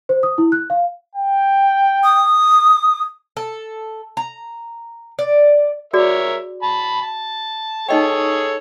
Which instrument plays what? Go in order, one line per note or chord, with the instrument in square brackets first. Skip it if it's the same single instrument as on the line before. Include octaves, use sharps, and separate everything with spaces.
[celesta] C5
D#6
E4
F#6
F5
[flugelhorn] G5
[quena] D#6
[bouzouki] A4
A#5
D5
[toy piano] F#4 G#4 D5 [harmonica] A#4 C#5 E5
[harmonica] A5 B5
A5
[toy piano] D#4 D#5 G5 [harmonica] G#4 A4 C#5